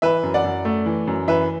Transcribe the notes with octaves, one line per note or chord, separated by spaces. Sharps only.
E3 B4 E5
F#2
D5 F#5
F#2
A3
E3
F#2
E3 B4 E5